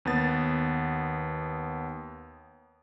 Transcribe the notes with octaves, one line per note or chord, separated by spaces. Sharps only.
D#2 B3 A6